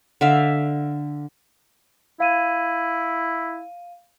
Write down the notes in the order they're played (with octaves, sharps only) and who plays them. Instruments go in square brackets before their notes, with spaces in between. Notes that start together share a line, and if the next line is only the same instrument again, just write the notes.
[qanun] D3 E5 F5
[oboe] E4 [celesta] F5 D#7